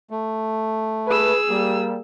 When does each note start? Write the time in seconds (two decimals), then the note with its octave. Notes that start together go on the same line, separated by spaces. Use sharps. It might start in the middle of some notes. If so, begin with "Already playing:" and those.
0.10 A3
1.08 G#4 B4 E6
1.49 G3 A#3